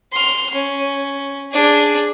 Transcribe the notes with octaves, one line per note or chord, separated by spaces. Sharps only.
C6 F6
C#4
D4 G#4